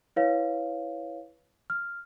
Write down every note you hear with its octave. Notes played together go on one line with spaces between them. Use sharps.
E4 B4 C#5 F5
F6